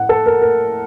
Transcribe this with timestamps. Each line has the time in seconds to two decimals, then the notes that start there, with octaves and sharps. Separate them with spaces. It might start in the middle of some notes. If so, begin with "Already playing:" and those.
Already playing: A2 F#5
0.09 A4
0.26 A#4
0.42 A#4